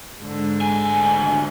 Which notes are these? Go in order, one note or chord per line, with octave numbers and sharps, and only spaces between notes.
G#2 D3
D2 G#5
D3